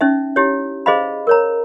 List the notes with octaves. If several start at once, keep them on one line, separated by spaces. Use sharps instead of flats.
C#4 D#4 E5
E4 G4 C#5
G#4 C5 D#5 F5 B5
A#4 C#5 A#5